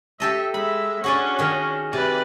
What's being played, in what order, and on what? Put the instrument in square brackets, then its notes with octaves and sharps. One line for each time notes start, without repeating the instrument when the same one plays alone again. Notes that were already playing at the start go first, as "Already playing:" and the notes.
[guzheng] G4 A4 D#5 [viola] E5
[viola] G#3 E5 [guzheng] B5
[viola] C#4 D4 [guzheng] F#4 G#4 D5
[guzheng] D#3 G#4
[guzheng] C3 [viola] B4 D5